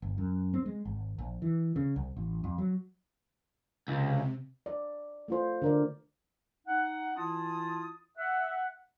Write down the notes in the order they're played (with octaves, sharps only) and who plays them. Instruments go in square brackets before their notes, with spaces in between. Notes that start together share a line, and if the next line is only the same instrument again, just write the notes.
[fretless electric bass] G1
F#2
C4
G#3
G#1
A#1
E3
C#3
C2
A1
F2
F#3
[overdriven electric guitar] C#2 [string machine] C3
[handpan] D5
A3 F4 C5
D3 A#4 D5
[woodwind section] D#4 F#5
E3 E4 F4 A5 D#6
E5 F#5